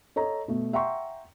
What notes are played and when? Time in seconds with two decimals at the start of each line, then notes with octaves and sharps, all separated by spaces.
0.16 A4 C#5 D#5 A#5
0.48 B2 A3
0.73 E5 F#5 G5 A#5 C6 C#6